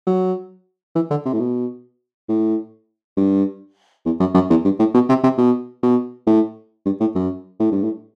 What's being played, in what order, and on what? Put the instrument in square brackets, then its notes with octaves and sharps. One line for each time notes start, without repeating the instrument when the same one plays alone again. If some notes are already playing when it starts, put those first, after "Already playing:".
[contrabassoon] F#3
E3
D3
C3
A2
B2
A2
G2
E2
F#2
F#2
E2
G2
A2
B2
C3
C3
B2
B2
A2
G2
A2
F#2
A2
G2
A2